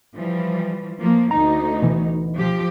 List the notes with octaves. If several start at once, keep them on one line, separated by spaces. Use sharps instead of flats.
E3 F3 G3
F3 A#3
D2 D#4 A#5
B2 E3
F3 G4